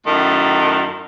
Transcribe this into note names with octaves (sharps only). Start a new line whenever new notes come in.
F#2 A2 D#3